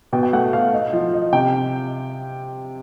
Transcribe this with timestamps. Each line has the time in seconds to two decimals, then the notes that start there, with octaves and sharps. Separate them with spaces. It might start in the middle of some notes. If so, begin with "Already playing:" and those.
0.13 B2 G5
0.23 G5
0.33 A3 F#5
0.53 B2 F5
0.73 D#4
0.93 F3
1.14 D#4
1.33 C3 G5